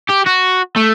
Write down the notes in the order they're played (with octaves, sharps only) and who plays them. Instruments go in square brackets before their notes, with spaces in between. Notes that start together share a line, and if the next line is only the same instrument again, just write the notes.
[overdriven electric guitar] G4
F#4
A3